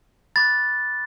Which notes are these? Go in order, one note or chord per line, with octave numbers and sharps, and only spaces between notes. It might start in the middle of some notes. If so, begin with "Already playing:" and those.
B5 D6 F#6 A6